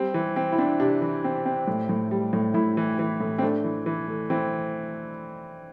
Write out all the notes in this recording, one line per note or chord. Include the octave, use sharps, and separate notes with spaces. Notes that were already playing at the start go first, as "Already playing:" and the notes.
Already playing: G3 C4
E3
C4
E4
C4 D4
C3 D4
E3
C4
C4
A2
A2
G3
A2
A2 E4
E3
E3
A2
C4
A3 D4
E3
E3
A3
E3 C4